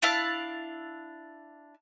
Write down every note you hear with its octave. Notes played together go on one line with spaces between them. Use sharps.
D4 E4 F5 A5